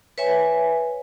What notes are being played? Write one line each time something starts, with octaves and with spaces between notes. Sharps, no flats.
B4 C#5 E5 G#5